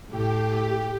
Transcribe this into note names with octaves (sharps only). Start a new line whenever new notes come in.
A2 G4